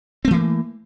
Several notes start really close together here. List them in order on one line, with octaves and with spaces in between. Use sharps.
C4 A3 E3 A#3